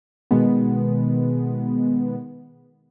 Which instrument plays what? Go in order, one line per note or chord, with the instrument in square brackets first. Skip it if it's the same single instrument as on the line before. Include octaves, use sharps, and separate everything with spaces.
[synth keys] B2 D#3 G#3 B3